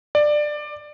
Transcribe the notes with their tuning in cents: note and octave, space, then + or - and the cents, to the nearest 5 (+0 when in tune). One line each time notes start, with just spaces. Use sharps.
D5 +15